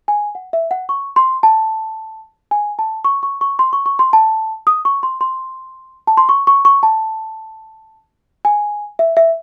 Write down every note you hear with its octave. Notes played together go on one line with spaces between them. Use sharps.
G#5
F#5
E5
F#5
C#6
C6
A5
G#5
A5
C#6
C#6
C#6
C6
C#6
C#6
C6
A5
D#6
C#6
C6
C6
A5
C6
C#6
C#6
C#6
A5
G#5
E5
E5